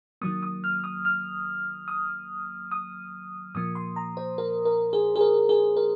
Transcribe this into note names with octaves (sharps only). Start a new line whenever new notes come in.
D#3 F#3 A#3 D#6
D#6
F6
D#6
F6
D#6
D#6
A#2 F3 A#3 D#6
C6
A#5
C5
A#4
A#4
G#4
G#4
A#4
G#4
A#4